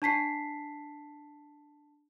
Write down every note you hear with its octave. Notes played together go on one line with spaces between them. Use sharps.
D4 A5 B6 C7